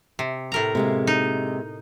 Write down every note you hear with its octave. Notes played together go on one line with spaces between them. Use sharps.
C3
A2 A#4 A#5
C3 G#3 A#3
D#4